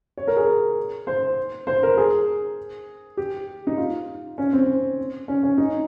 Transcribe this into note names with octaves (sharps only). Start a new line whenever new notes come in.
C#5
A#4
G#4
C5
C5
A#4
G#4
G4
D#4
F4
C#4
C4
C#4
C#4
D#4